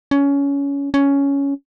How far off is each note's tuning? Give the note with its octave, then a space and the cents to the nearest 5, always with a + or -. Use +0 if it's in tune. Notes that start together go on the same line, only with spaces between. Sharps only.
C#4 +20
C#4 +10